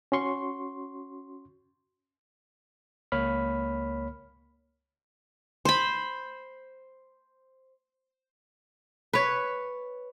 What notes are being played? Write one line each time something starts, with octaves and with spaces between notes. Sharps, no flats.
C#4 F#4 C6 C#6
C#2 A#3 C#5 B5 F6 B6
C5 B5
B4 C#5